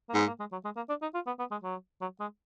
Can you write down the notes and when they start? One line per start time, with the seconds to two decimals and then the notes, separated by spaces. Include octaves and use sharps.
0.09 A#3
0.14 G#2 B3
0.27 A#3
0.39 G#3
0.52 F#3
0.64 G#3
0.76 A#3
0.89 D4
1.02 D#4
1.14 F4
1.27 B3
1.39 B3
1.51 G#3
1.64 F#3
2.01 F#3
2.20 G#3